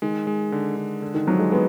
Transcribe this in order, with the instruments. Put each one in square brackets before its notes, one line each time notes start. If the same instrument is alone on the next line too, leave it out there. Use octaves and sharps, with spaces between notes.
[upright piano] D#3 [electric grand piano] G#3
[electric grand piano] G#3
D3
D3
D3
[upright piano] D#3
[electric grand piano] F3 [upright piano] F#3
[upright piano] G#3
[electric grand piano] G#3 [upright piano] B3